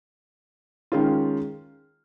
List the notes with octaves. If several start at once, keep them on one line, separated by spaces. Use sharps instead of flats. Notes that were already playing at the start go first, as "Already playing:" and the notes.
D#3 G#3 C#4 F4